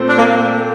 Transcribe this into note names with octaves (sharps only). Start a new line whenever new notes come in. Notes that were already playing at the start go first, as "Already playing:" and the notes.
Already playing: A#2 A3 C4
D4
A#3